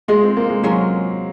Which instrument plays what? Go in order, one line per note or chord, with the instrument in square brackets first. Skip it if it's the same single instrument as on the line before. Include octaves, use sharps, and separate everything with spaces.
[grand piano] G#3 [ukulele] F4 G#4 D#5
[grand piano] C4
A#3
G#3
[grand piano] F#3 [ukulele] C#4 F4 A#4